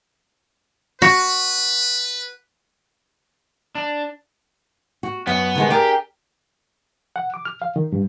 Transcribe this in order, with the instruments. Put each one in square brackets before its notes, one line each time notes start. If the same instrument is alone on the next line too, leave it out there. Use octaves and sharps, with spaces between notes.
[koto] F#4 [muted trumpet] B4
[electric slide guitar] D4
[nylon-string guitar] F#4
[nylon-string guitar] F#2 [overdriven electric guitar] B3
[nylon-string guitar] D3 D#3 G#3
[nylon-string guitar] D4 G#4 A#4 [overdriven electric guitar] G4
[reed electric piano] F#5
D6
F6
F5
D#3
G2